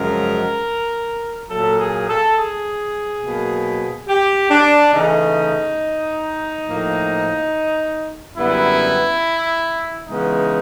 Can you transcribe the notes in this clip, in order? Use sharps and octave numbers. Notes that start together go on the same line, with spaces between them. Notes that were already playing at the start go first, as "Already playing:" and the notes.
Already playing: F#2 C#3 F3 G#3 A#4
A#2 F#3 A#3 A4
G#4
A4
G#4
B2 F#3 A#3
G4
D4
C#3 E3 A3 D#4
A2 F3 A#3
F#2 D3 G3 B3 E4
C#3 E3 G#3 B3 D#4